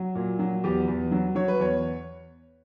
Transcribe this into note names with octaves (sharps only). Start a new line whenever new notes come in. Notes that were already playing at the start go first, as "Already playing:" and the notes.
Already playing: F#3
A#2
F#3
E2 G4
E2
F#3
F#3 C#5
B4
E2 C#5